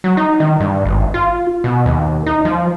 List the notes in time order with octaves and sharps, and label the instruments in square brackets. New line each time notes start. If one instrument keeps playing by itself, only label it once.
[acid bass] F#3
D#4
D#3
G2
G#1
F4
B2
D#2
D#4
F3